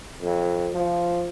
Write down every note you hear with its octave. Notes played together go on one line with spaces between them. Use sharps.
F2
F3